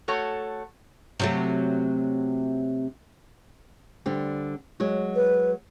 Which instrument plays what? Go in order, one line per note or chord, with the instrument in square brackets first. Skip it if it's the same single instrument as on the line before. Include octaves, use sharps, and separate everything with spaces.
[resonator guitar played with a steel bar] A3 F#4 A4 C#5
[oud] C3 F#3 A3
[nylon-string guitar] D3 G3 C4
F#3 G#3 F#4
[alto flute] B4